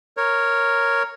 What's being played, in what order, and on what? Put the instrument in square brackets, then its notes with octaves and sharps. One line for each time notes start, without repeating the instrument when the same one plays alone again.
[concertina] A#4 C#5